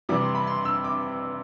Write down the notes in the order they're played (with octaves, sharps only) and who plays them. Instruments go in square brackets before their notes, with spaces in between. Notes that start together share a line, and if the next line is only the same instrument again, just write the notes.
[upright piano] C3 E3 G3 D6
C6
B5
C6
E6
D6